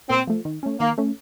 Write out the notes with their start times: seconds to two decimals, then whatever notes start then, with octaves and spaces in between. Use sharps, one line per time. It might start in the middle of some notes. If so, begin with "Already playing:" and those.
0.10 A#2 C4
0.27 F3 A3
0.45 D#3
0.63 A3 C#4
0.80 D#3 A#3
0.98 A3 C#4